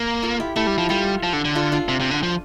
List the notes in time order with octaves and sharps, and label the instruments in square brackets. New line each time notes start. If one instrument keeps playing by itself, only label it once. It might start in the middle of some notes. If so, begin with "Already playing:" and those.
Already playing: [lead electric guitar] A#3
[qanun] F4 A4
E4 G4
[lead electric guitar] A3 [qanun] E4 G4
[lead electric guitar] G3
F3
[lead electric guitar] G3 [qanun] F4 A4
[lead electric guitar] F3
D3
D3
[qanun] F4 A4
D4 F4
[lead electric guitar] C3
C3
D3
F3